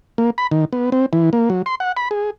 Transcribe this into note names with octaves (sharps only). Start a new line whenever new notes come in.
A#3
B5
D#3
B3
C4
E3
A#3
F#3
C6
F#5
B5
G#4